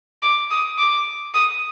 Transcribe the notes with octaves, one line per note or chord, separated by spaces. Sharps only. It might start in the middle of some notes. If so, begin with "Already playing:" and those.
D6
D#6
D6
D#6